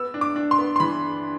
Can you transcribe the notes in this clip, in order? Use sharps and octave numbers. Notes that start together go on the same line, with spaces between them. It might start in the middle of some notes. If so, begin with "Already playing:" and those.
Already playing: B3 E6
D4
D6
D4
C6
B3
C6
E3 B5